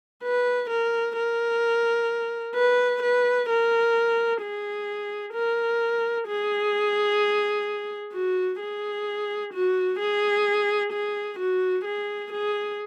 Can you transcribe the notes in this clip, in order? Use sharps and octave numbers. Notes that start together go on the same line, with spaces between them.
B4
A#4
A#4
B4
B4
A#4
G#4
A#4
G#4
F#4
G#4
F#4
G#4
G#4
F#4
G#4
G#4